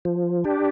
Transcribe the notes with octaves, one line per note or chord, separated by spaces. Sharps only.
F3
D4 G4